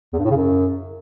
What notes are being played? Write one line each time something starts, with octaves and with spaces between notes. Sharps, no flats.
E2
G2
A2
C#3
F#2